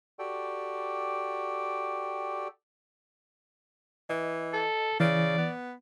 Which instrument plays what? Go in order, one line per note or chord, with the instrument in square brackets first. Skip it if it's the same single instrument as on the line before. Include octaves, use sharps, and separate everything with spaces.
[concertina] F#4 G4 A4 D5 G5
[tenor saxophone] E3 [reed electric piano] D#5
[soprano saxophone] A4
[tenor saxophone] C#3 [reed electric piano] E3 [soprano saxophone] D5
[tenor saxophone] B3